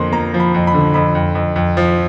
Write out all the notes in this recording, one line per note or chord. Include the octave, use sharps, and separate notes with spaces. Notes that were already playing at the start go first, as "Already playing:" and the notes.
Already playing: F2 D3 F3 A#3 C6
A#3 A#5
F3
B5
F2
B5
D3
F2 B5
F2
F2
F2
F3